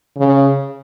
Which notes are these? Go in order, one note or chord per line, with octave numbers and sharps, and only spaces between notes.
C#3